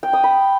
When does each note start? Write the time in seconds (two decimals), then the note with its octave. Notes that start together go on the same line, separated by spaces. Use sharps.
0.03 G5
0.13 D#6
0.24 B5